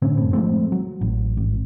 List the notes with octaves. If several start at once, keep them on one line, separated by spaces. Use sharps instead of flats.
A2 D3 C4 C#4
F#1 A2
F3 G#3 A3 C4
F#3
A1
G#1